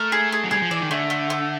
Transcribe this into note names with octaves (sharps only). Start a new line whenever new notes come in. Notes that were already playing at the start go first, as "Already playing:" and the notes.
Already playing: A3 A#4
G#4
G#4
F#3
G3 G#4
F3
E3 D5
D#3
D3 A3
A3
A3